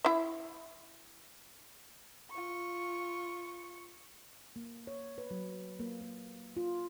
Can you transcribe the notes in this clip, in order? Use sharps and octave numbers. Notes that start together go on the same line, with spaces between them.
E4 E5
F4 C#6
A#3
C#5
B4
F#3
A#3
A#3
F4